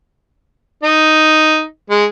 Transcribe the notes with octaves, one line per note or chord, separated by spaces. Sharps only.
D#4
G#3